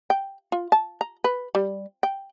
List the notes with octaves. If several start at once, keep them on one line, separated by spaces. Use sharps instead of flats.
G5
F4
A5
A#5
B4
G3
G5